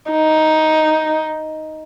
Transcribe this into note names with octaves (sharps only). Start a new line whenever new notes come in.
D#4